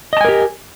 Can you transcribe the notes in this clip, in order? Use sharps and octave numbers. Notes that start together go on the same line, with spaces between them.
G4 A#4 D#5 G#5 A5